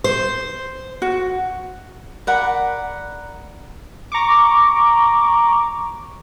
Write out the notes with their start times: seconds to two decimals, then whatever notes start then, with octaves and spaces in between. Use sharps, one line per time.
0.04 C5
1.02 F#4
2.27 A#4 D5 F#5 B5
4.12 A#5 C#6 D6